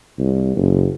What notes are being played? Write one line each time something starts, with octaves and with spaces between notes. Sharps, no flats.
C2
F#1